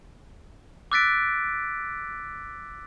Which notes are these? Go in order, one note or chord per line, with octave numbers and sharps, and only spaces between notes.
D6 E6 F#6 A6 B6 D7